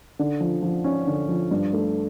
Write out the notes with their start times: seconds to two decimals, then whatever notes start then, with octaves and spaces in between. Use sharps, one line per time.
0.19 D3
0.40 F3
0.62 F3
0.84 C#4
1.07 D3
1.29 F3
1.51 G2
1.73 A3